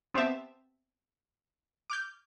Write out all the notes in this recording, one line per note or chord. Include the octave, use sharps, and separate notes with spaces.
B3 C4 G4 C5 E5 A5
D6 F6 G6